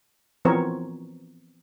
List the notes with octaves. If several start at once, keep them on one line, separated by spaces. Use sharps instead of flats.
E3 F3 B3 C4 A#4 C#5